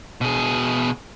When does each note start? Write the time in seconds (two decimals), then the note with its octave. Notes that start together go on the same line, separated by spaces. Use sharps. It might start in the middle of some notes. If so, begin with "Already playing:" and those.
0.21 B2 G#4